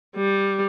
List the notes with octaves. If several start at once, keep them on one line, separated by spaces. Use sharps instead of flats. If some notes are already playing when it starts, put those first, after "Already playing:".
G3